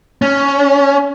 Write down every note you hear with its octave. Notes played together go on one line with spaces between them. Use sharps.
C#4